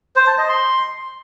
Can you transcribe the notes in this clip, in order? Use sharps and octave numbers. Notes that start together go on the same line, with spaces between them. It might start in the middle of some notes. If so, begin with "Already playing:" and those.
C5
A5
D#5
C6